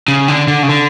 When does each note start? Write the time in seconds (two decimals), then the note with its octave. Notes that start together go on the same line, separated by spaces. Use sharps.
0.08 C#3
0.28 D3
0.48 D3
0.63 C#3
0.69 D3